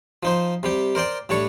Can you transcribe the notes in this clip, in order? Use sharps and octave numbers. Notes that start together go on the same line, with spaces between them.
F3 D#4 C5
C3 G3 G4
A#4 C5 D5 G5
A2 G3 D4 C#5 C#6